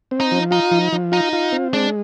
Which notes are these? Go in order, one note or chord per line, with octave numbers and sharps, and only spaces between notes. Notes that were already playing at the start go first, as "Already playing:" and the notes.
C4
D#4
F3
D#4 F4
F3
F3
D#4 F4
F4
C4
G#3 D4